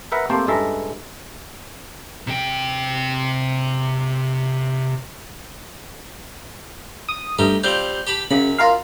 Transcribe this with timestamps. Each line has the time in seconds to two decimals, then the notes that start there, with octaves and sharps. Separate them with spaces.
0.12 A#4 B4 E5 F#5
0.30 A3 A#3 C4 G4 A4 C5
0.47 C#2 G2 G#3 A4 E5 A#5
2.27 C3 G5
7.09 D#6
7.39 G2 A3 D#4 G4
7.64 G3 C4 F4 G6
8.07 G4 A5 B5
8.31 F#2 C#3 B5
8.58 F4 A#4 F5